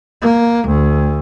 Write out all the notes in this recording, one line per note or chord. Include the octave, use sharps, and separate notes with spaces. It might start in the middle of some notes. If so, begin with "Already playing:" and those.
A#3
D2